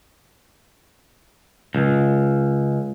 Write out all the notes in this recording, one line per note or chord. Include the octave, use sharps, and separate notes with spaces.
C#2